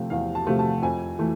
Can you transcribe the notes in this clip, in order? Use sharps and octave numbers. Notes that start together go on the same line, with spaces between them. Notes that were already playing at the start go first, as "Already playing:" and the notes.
Already playing: C3 F3 A3
E2 F5
A5
C3 F3 A3
A5
F2 G#5
E3 A3